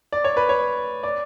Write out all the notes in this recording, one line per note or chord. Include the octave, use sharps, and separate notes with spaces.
D5
C#5
B4
C#5
D5